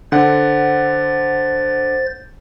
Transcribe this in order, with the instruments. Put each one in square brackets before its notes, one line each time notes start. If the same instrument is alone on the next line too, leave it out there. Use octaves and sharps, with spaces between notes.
[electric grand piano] D3 F#5 [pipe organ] C5 A6